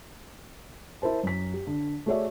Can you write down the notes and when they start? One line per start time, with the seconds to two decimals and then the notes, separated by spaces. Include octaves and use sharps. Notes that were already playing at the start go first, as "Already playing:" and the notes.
1.02 E4 A#4 C5 A5
1.23 F#2 B6
1.54 G4
1.67 D3
2.06 A3 F#4 G#4 C#5 D5 E5